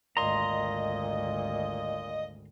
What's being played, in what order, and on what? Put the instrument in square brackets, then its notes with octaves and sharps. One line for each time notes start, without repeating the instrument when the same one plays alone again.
[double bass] G#1 D2 [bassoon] A#2 [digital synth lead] D#5 [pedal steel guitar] A#5 C6